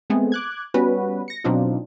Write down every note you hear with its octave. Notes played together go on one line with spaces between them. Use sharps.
G#3 A3 B3 C4 G#4
D6 F#6 G#6
G3 B3 C#4 F#4 B4
A#6 C#7
B2 F#3 C4 D4 D#4 F4